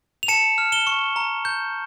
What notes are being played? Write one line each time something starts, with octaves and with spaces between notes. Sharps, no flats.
F7
A5 C#7 E7
F6
E7 G7
C#6
A#5
G6